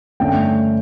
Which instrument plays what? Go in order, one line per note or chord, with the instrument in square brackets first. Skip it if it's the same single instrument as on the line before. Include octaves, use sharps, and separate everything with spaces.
[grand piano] G2 D3 A3 C#4 G5